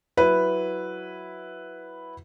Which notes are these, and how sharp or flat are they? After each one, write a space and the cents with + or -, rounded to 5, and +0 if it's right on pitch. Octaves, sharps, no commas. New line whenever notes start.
F#3 +0 E4 +0 B4 +0